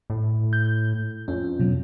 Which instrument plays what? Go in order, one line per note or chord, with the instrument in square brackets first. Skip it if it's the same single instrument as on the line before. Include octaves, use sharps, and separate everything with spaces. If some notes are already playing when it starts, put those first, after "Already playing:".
[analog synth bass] A2
[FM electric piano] G6
[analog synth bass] F2 [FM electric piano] C#4
[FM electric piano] B2 F#3